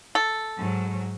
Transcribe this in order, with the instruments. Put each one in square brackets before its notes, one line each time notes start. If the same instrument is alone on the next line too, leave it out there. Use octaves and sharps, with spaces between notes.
[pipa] A4
[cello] G#2 F#3